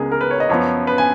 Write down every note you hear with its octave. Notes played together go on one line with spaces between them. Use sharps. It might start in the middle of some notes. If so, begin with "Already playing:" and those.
Already playing: C#2 C#3 G#3 B3 G#4 A#4
A#4
B4
C#5
D#5
F#2 F3 B3 C#5
B4
G#5